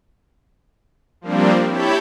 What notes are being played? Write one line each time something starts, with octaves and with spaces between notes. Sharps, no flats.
F3 G3 A#3 C4 D4
E4 G4 C#5 A5 B5 G6